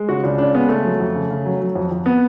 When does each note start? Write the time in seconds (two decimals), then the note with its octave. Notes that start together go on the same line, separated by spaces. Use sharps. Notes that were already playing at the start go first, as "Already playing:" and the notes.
Already playing: G#3
0.09 C#3 F#4
0.24 C#2 D4
0.38 C#4 D4
0.54 G#3 B3
0.69 C#3 A3
0.84 F#3
1.00 F2
1.15 C#3
1.31 C#3
1.45 F#3
1.60 F#3
1.75 F2
1.91 F2
2.06 B3